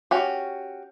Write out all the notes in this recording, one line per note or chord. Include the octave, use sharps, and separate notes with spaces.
C#4 F#4 G4